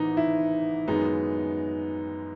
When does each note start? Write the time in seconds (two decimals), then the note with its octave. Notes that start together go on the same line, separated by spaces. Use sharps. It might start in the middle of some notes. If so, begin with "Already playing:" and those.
Already playing: A1 G#2 E3 B3 D#4
0.17 E4
0.88 F#2 D#3 G#3 B3 D#4